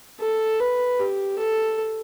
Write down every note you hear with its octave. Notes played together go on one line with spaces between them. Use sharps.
A4
B4
G4
A4